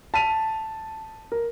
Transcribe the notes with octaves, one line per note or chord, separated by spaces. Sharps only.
A5 B6 D#7 F7
A#4